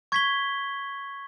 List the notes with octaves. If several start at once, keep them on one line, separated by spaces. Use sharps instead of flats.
C#6 G#6 B6 G7